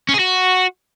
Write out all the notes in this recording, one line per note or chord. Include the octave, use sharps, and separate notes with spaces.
C#4
G#4
F#4